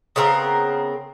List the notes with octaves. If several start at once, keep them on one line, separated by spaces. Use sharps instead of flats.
C#3 B3 C4 A#4